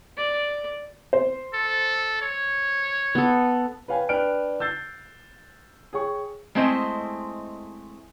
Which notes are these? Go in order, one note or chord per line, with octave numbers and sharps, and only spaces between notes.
D5
C5
A4
C#5
B3 A4
B4 C#5 F5 G5 G#5
D4 B4 G5 F6 F#6 D7
E6 G6 A6 C7
G#4 C#5 G5 C#6
G#3 A3 C4 E4 C5 D#5